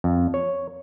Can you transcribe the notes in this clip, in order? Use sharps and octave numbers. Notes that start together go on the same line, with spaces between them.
F2
C#5